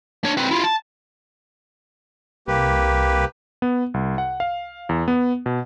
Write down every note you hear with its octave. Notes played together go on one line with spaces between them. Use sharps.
D4 C#5
C4 B4
E4 F4
A5
C2 A#3 G4 B4
B3
C2
F#5
F5
E2
B3
B2